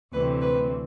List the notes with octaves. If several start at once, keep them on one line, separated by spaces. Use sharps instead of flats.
D2 C3 E3 A3 C4 B4
B4